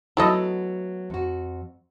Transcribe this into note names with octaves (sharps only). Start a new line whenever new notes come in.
F#3 A3 B3 E4 A4 D#5
F2 F#4